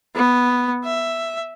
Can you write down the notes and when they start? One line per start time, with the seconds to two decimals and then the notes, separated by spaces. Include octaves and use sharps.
0.16 B3
0.85 E5